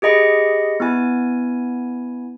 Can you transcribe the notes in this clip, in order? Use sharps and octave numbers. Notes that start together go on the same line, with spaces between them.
G4 G#4 D#5 B5 C#7
B3 E4 G#5